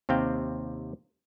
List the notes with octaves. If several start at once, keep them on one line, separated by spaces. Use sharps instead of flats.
D#2 C3 C4 F5 G5